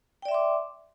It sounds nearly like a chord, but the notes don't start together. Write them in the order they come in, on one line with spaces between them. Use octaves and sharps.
G5 D5 E5 C6 D6